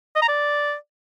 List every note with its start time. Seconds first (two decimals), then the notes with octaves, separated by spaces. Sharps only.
0.16 D#5
0.22 A#5
0.28 D5